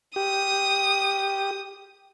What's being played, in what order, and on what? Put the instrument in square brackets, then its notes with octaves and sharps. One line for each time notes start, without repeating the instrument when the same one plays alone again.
[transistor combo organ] G4 [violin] D#6